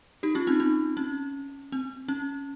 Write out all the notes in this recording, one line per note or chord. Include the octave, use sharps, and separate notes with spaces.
D#4 G4
C#4 F4
C4 D#4
C4 D#4
C#4
C4
C#4